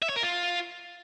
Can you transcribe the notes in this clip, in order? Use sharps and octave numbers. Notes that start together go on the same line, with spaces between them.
E5
C#5
A#4
F4